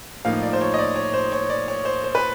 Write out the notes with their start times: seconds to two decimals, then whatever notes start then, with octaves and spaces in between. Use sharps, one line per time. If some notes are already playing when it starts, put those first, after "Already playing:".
0.25 A2 F3 A#3 D#4 F5
0.43 D5
0.53 C5
0.61 C#5
0.74 D#5
0.78 D5
0.96 C#5
1.14 C5
1.32 C#5
1.50 D5
1.68 C#5
1.85 C5
2.04 C5
2.15 B4